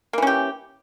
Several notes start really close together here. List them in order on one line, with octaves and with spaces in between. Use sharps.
A#3 E3 C#4 G4